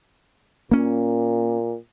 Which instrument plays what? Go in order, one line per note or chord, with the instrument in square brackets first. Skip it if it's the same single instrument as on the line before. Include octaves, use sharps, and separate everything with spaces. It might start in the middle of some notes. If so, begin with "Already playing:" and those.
[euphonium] A#2 [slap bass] A#3 C#4